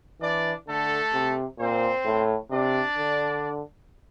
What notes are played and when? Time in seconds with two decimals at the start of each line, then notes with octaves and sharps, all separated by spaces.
0.21 E3 D4 D5
0.67 D3 A3 A4
1.14 C3
1.59 A#2 C4 C5
2.05 A2
2.51 C3 D4 D5
2.97 D3